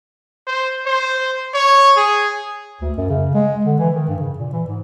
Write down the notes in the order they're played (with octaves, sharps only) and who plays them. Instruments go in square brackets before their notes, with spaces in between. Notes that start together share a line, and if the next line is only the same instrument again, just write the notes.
[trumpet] C5
C5
C#5
G#4
[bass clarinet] D2
F#2
C#3
G#3
D3
E3
D#3
G2
C#3
A#2
E3
G#2